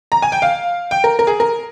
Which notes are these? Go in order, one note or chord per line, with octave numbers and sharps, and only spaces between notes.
A#5
G#5
G5
F5
G5
A#4
A#4
G#4
A#4